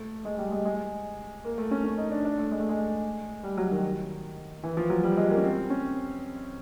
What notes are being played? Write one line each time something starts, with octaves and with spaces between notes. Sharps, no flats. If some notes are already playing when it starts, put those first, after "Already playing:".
Already playing: A3
G#3
G3
G#3
G#3
A#3
A3
C#4
C#4
D#4
D4
D4
A3
G#3
A3
G#3
G3
F#3
D#3
E3
F3
F#3
G3
G#3
A#3
C#4
C4
C#4